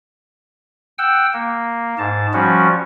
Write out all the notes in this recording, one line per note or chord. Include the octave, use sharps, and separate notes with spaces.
F#5 G5 E6
A#3
G#2 A5
F3 G3 C#4 F#4